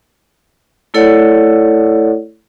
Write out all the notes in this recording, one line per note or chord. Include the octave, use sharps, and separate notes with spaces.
A3 E4 A4 C#5 D5 F#5